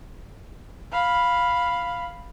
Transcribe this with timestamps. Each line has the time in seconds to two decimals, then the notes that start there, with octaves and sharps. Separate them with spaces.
0.91 F5 B5